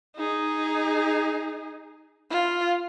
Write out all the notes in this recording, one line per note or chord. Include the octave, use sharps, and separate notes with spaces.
D#4 G#4
F4